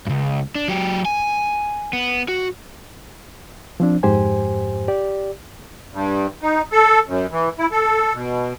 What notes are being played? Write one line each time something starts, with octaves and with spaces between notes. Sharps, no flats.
C#2 G2
D4
F#3 G4
G#5
B3
F#4
F3 C4 D4
F2 G#2 G4 C5 G#5
G4 D5
G2
D#4
A4
F#2
E3
E4
A4
B2